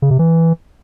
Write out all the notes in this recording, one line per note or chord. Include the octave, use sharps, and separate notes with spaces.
C#3
C3
E3